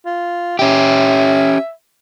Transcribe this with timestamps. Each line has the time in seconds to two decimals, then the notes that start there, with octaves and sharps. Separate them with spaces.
0.06 F4
0.59 C#4 G4 E5